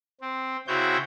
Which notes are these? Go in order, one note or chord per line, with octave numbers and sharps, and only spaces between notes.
C4
C#3 C4 E4 F#4 C#5 G6